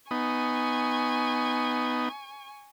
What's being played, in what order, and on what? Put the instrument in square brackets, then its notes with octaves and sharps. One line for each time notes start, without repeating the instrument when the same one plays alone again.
[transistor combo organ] B3 D#4 [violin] G#5 C#6